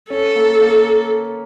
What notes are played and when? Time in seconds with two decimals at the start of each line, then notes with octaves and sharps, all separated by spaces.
0.10 C#4 A4
0.35 A#3
0.61 A#3